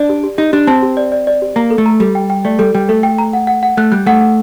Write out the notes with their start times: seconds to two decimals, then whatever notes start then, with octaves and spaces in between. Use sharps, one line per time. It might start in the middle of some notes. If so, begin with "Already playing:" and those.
Already playing: D4 D5
0.09 G4
0.23 G4
0.38 D#4 G4
0.53 D4 G4
0.67 C4 A5
0.83 G4
0.97 D5
1.12 D5
1.27 D5
1.42 G4
1.56 A#3 A#5
1.70 A4
1.78 A3
1.86 A#5
2.00 G3 A4
2.15 G5
2.30 G5
2.45 A3 D5
2.59 G3 A4
2.75 G3 G5
2.89 A3 A4
3.03 G5
3.18 A#5
3.33 F#5
3.47 F#5
3.63 F#5
3.77 A3 F#6
3.92 G3 F#6
4.06 A3 F#5
4.21 F#5